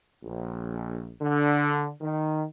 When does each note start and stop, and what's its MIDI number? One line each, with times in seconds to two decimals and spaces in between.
0.24 1.10 34
1.21 1.89 50
2.01 2.44 51